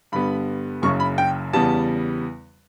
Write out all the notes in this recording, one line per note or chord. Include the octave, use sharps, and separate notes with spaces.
G2 D3 G3 B3 B5
F#1 F#2 C#3 C#6
B5
G5
E2 C#3 G3 B3 A5